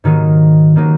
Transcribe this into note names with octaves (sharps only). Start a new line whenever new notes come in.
G#2 D#3 F#3 A#3 D#4
D#3 F#3 A#3 D#4